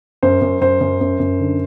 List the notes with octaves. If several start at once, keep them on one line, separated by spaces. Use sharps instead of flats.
F#2 C5
F#2
F#2 C5
F#2
F#2
F#2
D3